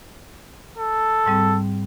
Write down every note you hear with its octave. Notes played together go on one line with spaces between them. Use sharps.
A4
G#2 G3 C4